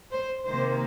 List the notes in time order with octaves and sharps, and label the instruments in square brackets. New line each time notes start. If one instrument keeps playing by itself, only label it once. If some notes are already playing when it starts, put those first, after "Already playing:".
[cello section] C5
C3 D#3 A#3 C5